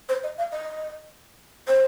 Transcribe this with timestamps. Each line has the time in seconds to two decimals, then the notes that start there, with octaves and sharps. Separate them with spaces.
0.09 C5
0.24 D#5
0.38 F5
0.52 D#5
1.68 C5